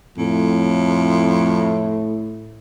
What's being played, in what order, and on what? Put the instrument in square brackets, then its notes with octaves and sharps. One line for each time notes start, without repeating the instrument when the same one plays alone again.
[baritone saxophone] F2 [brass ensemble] A2